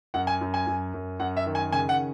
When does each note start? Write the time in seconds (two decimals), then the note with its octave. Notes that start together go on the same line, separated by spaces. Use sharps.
0.14 F#2 F#5
0.27 G#5
0.41 F#2
0.54 G#5
0.67 F#2
0.94 F#2
1.19 F#2 F#5
1.36 E5
1.46 D#3
1.55 G#5
1.72 C#3 G#5
1.89 F#5